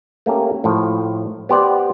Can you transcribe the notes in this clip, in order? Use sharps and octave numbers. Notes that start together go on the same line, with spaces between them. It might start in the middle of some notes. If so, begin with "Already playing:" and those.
A3 A#3 C#4 G4
A2 F3
B3 G4 C5 D5